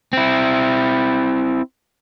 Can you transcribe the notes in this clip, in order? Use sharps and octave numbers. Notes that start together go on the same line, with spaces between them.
C4 E4